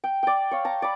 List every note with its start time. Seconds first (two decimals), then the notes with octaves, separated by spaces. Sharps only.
0.04 G5
0.23 D5 G5
0.51 C#5 F5
0.65 A5 A#5
0.82 D5 B5